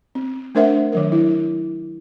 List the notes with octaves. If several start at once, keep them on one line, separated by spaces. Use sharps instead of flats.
C4
A3 D4 A#4 C5 E5 F#5
D#3 F#3 A#4
E4